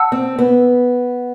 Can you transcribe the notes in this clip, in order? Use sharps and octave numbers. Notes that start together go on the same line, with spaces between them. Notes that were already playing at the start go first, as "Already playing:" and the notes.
Already playing: F#5 A5 E6
C4
B3